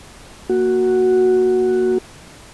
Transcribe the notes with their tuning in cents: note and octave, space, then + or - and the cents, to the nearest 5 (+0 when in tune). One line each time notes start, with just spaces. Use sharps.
A#3 +0 F#4 +0